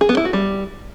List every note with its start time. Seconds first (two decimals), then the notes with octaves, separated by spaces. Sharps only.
0.01 G#4
0.09 B3
0.17 E4
0.25 F#4
0.33 G3